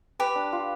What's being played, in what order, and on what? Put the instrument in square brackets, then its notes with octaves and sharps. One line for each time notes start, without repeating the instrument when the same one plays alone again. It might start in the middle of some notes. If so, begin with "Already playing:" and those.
[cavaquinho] G4 [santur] B4
[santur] D4
F4